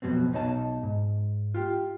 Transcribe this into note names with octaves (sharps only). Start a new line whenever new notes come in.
F2 B2 F#3 B3 C4
B1 B2 D#4 C#5 D#5 A5
G#2
F4 G4